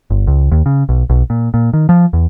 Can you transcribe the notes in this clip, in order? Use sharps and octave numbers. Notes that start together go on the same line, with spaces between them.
G1
C#2
D#2
C#3
B1
B1
A#2
A#2
D#3
F3
E2